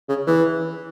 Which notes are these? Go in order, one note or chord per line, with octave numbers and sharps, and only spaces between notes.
C#3
E3